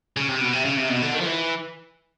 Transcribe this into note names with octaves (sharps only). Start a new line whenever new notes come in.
C#3
C3
B2
C3
C#3
C3
B2
D3
D#3
F3
E3